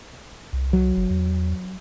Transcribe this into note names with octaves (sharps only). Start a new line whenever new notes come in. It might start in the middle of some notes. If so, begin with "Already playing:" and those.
C2
F#3
G1
E2